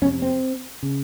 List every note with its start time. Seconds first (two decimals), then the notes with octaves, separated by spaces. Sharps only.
0.02 F2 C#4
0.05 C3
0.22 C4
0.83 C#3